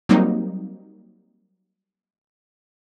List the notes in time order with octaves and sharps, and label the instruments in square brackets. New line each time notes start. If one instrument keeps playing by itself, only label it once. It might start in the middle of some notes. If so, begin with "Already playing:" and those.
[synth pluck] F#3 G3 A#3 C4 D#4